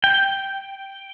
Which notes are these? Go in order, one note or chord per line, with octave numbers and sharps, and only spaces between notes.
G5